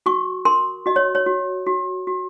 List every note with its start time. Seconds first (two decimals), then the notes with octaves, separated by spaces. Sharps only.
0.06 F#4 C#6
0.45 A#4 C6
0.86 F#4 D#5
0.96 C#5
1.15 C#5
1.26 F#4
1.66 F#4
2.07 F#4